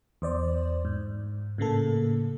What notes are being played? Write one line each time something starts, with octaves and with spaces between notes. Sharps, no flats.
E2 C5 D5
G#2
A2 C#3 A#3 A4